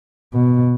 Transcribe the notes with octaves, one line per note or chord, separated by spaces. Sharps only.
B2